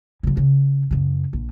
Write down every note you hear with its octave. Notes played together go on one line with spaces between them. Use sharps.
C#3 F#3
C#3
F#2 C#3
A#1